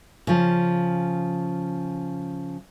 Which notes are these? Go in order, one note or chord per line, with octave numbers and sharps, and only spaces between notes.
C#3 F3